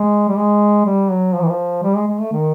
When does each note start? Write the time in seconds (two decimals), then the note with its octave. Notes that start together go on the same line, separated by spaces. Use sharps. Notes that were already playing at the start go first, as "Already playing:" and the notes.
Already playing: G#3
0.29 G3
0.37 G#3
0.86 G3
1.11 F#3
1.35 F3
1.42 E3
1.49 F3
1.83 G3
1.96 G#3
2.08 G#3
2.20 A3
2.32 D#3